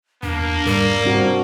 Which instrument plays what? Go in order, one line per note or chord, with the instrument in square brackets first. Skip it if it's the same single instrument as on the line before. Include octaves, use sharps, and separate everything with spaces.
[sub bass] E2 [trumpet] A#3 [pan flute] D4
[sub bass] G#2 [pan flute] G3 [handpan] A#4
[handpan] C4 D4 F#4